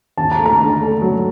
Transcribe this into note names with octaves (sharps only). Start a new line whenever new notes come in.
D#2 A5
A#5
A3
A#5
D3
A3
F#3